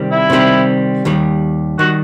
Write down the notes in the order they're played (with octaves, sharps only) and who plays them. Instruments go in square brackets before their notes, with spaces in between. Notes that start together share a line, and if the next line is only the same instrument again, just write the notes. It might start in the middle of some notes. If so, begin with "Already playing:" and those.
Already playing: [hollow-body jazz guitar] C3 D#3 G3 C4
[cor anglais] E4
[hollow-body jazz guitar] C3 D#3 G3 C4
D#2 D#3 G3
[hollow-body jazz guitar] D#3 G3 [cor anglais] F#4